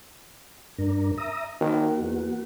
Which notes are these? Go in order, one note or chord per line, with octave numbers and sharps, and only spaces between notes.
G2 D4 A#4
E5 A#5 D#6
D#3 A#3 F#4
E2